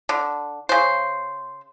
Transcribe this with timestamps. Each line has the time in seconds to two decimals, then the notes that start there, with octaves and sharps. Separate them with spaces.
0.09 D3
0.69 C#3 C5